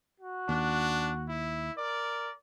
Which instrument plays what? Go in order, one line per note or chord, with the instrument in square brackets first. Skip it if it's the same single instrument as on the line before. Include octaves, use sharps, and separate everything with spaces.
[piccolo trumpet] F#4
[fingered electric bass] D#2 [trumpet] D4
[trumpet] E4
[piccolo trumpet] A#4 [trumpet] D5